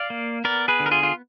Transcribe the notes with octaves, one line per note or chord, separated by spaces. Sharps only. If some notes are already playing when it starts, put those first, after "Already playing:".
Already playing: D5 F5
A#3
B3 A#4 D5
G#4 B4
D3
A#4
F4 G#4
F4